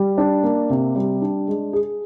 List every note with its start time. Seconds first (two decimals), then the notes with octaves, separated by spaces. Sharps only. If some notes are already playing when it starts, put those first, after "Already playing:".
Already playing: G3
0.18 D4
0.43 A#3
0.70 C3
0.95 G3
1.22 D4
1.48 G#3
1.73 G#4